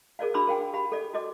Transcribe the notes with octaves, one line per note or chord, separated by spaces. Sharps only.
G#4 A#4 D5 F5
D4 F#4 B5 C6 D6 E6
A#4 F5 G5 G#5
G4 F5 B5
A4 D5
F#4 A4 D#5 D6